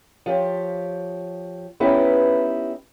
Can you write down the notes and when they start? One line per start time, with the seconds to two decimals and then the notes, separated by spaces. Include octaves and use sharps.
0.26 F3 G4 C#5
1.80 B3 C#4 D#4 E4 G4 B4